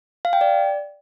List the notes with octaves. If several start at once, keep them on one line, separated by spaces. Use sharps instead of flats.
F5
G5
D5